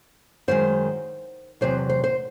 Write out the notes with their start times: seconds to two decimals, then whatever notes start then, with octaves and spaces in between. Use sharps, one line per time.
0.48 F#2 D#3 G#3 C5
1.61 E2 C3 F#3 C5
1.89 C5
2.04 C5